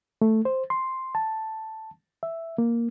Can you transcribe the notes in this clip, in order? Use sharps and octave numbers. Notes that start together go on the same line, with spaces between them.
A3
C5
C6
A5
E5
A#3